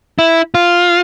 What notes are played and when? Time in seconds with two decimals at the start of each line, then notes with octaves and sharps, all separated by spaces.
0.19 E4
0.55 F4